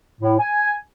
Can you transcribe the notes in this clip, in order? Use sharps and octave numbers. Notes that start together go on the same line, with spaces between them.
A2
G#5